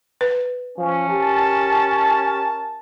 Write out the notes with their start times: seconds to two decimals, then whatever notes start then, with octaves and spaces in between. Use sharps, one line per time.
0.21 B4
0.78 F3 C#4
1.09 G4 A#4 A5